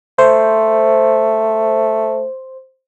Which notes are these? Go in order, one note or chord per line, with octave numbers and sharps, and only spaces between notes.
A3 C5